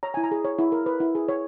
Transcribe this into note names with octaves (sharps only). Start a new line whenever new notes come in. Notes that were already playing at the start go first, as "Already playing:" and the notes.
C#5 A#5
E4 G#5
A#5
G#4
C#5
E4
A#4
B4
E4
G#4
C#5